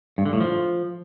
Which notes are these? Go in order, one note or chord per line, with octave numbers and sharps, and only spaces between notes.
G2
D3
A2
F3